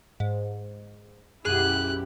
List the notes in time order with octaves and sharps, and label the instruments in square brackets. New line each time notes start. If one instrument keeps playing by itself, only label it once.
[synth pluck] G#2
[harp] B1 F#2 [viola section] E4 G4 [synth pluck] G#4 [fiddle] F#6